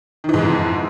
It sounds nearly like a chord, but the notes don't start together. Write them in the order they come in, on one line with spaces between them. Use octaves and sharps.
D#3 E3 G#2 F2